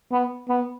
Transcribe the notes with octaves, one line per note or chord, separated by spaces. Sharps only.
B3
B3